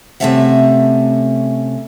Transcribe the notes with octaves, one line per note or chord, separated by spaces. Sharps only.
C3 E3 A3 C#4 E5 F#5